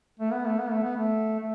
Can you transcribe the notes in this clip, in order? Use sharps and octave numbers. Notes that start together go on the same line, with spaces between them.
A3
B3
A3
B3
A3
B3
A3
A3